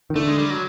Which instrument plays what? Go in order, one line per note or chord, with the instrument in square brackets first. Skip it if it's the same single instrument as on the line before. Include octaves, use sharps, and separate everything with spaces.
[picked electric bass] D#3
[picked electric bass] D3 [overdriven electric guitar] A3
[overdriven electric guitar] G#3
G3
F#3